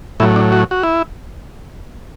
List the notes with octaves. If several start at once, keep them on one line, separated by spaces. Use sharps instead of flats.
A2 F#3 E4
D4
F#4
F#4
E4